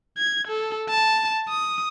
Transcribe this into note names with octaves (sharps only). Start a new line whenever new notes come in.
G#6
A4
A5
D#6